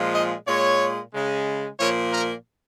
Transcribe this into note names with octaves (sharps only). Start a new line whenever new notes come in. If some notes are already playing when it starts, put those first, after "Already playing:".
Already playing: A#2 F3 G#3
D#5
A#2 G#3 C#5
C#3 G#3
A#2 F3 A#3 C#5
A#4